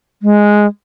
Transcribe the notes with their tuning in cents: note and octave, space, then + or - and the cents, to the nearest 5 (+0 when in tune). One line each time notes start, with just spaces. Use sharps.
G#3 +0